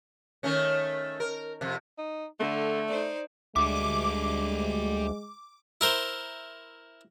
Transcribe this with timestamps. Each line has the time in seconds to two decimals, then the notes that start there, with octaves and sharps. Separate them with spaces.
0.43 D#3 A3 C#4
1.20 A#4
1.61 F2 C3
1.98 D#4
2.40 D3 A3
2.89 D#4 C5 D5
3.56 D2 G3 G#3 E5 D6
5.81 E4 A#4 C5